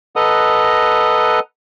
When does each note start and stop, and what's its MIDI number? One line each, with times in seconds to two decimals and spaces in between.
0.16 1.39 69
0.16 1.39 71
0.16 1.39 75
0.16 1.39 78
0.16 1.39 82
0.16 1.39 87